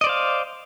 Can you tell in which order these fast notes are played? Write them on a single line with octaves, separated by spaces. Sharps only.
D#5 D5 C5 F5